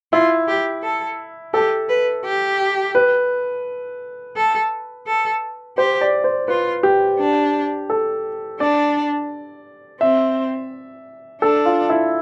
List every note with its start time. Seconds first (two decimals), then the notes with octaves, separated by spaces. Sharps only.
0.12 E4 F4
0.48 G4
0.83 A4
1.54 G4 A4
1.89 B4
2.25 G4
2.95 B4
4.36 A4
5.07 A4
5.77 G4 C5
6.01 D5
6.24 C5
6.48 F4 B4
6.83 G4
7.19 D4
7.90 A4
8.60 D4 D5
10.01 C4 E5
11.42 D4 A4
11.65 F4
11.90 E4